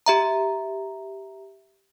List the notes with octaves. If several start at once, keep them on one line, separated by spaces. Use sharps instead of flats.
G4 E5 A#5